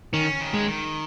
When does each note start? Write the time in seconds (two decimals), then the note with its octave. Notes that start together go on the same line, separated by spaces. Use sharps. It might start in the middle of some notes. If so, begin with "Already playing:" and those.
0.13 D#3 C#4
0.41 D#3
0.54 G#3
0.68 D#3